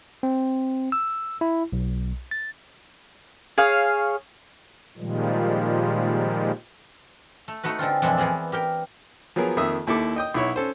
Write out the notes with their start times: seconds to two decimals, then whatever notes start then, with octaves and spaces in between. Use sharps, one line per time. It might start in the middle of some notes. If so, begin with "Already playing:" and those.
0.23 C4
0.92 E6
1.41 E4
1.73 B1
2.31 A6
3.58 G#4 C#5 F5
4.98 A#2 D#3 F3 G3 G#3
7.48 A3
7.63 A3 D#4 F#4 B4
7.79 D3 G#3 C4 F4
8.02 F2 A#2 E3 G#3 D4 E4
8.17 E3 B3 G#4 A#4 C5 D5
8.52 G4 A#4 G5
9.36 F3 F#3 B3 G#4 A#4
9.57 F2 D#3 A#3 E5 D#6
9.87 D#2 E4 A4 D6
10.16 D#5 G5 D#6
10.34 B1 E4 C#5
10.56 C#4 A4 C5